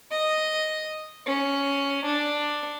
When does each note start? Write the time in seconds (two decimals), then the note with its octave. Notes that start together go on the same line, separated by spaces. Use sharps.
0.10 D#5
1.25 C#4
2.05 D4